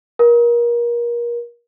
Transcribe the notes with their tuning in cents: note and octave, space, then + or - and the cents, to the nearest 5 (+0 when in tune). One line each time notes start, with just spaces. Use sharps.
A#4 +30